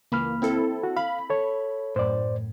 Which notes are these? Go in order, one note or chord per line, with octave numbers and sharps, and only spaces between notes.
C#2 E3 A#3 B5 F6
C4 E4 A4
F#4
F5 B5
A4 C#5
F#2 A2 C5 D5